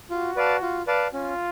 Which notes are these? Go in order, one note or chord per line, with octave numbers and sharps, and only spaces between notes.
F4 F#4
B4 D5 F5 A5
F4
B4 D5 F5 A5
C#4 F4